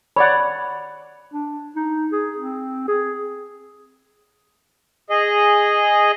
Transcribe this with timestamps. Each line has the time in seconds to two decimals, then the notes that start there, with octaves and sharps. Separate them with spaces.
0.16 C#5 D5 F#5 B5
1.32 D4
1.76 D#4
2.12 G#4
2.37 C4
2.88 G#4
5.10 G#4 D#5